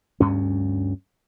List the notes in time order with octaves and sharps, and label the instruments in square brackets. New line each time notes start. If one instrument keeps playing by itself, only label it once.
[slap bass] D2 G2 C#4